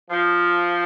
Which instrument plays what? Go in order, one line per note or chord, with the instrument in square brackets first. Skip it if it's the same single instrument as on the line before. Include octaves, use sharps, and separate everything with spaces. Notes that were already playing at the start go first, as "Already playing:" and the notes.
[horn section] F3